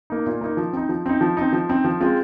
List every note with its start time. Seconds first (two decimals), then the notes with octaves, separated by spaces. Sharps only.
0.10 A#3 D#4
0.26 A#2
0.41 A#3 D#4
0.57 F3
0.73 C4 D#4
0.89 F3
1.06 C4 D#4
1.21 F3
1.37 C4 D#4
1.53 F3
1.69 C4 D#4
1.84 F3
2.00 G#3 C4 F4